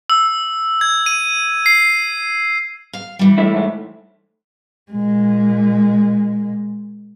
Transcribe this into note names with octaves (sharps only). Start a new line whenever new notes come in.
E6
G#6
D#7
C7
F5
E3 G3
A3 E4
G#2 A3
A#2 G#3